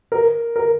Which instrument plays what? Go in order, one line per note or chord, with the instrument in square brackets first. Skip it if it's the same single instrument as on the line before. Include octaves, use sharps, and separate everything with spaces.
[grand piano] A#4
A#4